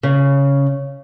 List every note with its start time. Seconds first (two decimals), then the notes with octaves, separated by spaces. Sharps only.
0.03 C#3